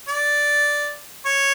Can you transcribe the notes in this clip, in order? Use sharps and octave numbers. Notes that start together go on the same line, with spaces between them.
D5
C#5